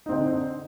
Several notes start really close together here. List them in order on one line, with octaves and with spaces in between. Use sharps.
D#4 C4 D3